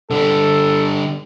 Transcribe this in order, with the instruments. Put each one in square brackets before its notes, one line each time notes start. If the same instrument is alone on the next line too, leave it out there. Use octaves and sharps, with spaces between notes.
[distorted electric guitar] D3 G3 [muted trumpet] A4